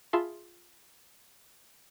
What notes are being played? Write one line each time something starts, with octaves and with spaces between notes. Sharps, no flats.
F4 G#4 E5 A5 B5 C6